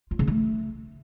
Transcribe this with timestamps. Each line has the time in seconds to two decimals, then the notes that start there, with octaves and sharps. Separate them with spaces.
0.11 F4
0.19 C#3
0.27 A3